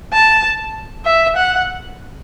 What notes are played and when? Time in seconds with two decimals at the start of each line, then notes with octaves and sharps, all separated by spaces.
0.13 A5
1.06 E5
1.37 F#5